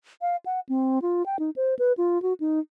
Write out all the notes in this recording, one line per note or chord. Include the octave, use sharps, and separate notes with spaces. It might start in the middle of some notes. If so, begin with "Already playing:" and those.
F5
F#5
C4
F4
G5
D#4
C5
B4
F4
F#4
D#4